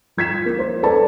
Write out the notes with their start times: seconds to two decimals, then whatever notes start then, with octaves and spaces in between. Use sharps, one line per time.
0.17 F3 G#6 B6 E7
0.46 A#3
0.59 C5
0.83 A4 B4 D5 A5